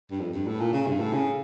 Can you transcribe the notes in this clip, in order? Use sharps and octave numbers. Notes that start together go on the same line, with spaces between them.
G2
F2
G2
A2
A#2
C#3
G2
A2
C#3